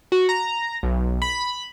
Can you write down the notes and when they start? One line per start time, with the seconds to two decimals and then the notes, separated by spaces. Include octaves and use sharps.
0.12 F#4
0.29 A#5
0.83 B1
1.22 B5